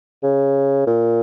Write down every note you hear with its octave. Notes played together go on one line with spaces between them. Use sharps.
C#3
A#2